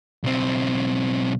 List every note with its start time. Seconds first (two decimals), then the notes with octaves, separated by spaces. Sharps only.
0.24 B1 C4